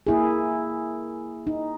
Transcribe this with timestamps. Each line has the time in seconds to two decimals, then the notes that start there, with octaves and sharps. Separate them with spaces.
0.07 A#3 E4 G#4
1.47 D#4